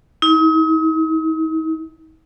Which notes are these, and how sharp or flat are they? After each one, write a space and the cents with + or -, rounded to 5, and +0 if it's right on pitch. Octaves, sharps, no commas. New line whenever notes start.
D#4 +40